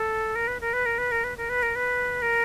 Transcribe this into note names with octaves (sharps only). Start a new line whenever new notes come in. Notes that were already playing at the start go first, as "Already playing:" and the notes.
Already playing: A4
A#4
B4
A#4
B4
A#4
B4
A#4
B4
A#4
B4
A#4
B4
A#4